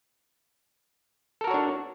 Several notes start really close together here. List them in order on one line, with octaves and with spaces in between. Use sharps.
A4 A#4 F#4 C#5 D4